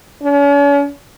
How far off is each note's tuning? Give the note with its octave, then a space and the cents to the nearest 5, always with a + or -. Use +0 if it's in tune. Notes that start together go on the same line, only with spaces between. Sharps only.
C#4 +40